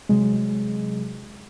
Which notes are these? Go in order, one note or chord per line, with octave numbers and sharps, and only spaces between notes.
C3 F#3 G#3